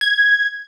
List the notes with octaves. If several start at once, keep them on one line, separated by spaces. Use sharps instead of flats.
G#6